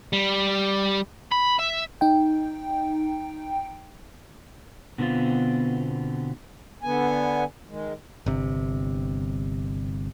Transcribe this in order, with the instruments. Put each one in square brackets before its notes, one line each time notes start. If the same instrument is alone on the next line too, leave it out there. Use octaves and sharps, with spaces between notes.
[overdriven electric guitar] G3
B5
E5
[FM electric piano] D#4 G5
[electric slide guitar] B2 D3 B3 C4 F4
[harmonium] D3 B3 G#5
D#3 G#3
[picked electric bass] G1 C3